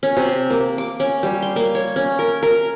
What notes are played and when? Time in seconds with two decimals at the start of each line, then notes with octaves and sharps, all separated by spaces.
0.03 C#4
0.17 C3
0.50 A#3
0.78 D6
1.00 C#4
1.23 G3
1.42 C6
1.56 A#3
1.75 C#5
1.96 C#4
2.19 A#4
2.43 A#4